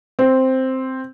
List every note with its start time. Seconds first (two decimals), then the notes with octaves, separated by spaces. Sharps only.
0.19 C4